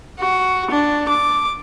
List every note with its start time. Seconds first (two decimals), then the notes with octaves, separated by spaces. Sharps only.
0.20 F#4
0.71 D4
1.09 D6